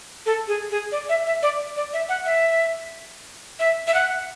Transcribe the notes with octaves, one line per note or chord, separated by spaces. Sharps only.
A4
G#4
G#4
D5
E5
E5
D5
D5
E5
F#5
E5
E5
E5
F#5